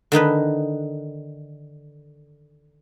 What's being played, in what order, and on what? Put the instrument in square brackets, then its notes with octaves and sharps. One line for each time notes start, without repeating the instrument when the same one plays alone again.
[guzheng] D3 D#3 D#4 B4